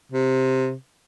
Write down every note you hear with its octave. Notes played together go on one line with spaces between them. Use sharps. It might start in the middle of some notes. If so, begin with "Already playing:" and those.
C3